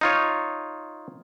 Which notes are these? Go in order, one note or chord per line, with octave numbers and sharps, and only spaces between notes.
D#4 F4 C#5